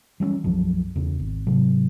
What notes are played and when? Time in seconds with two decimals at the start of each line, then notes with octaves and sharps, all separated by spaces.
0.20 E3 G3 A#3 C#4
0.44 B1 F#2 F3 F#3
0.96 E2 C#3
1.19 G#1
1.47 G#2 C3 F#3